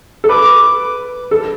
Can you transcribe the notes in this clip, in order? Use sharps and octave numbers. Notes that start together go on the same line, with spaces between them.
A4
B4 D6
A4